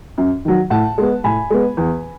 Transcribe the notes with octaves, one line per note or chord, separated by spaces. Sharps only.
F#2
D#3 F#3
A2 F#5 A5
G#3 B3
A2 G#5 B5
G#3 B3
E2